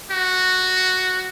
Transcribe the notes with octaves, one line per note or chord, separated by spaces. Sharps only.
F#4